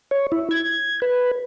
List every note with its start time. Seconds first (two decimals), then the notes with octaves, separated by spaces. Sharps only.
0.11 C#5
0.32 E4
0.51 G#6
1.02 B4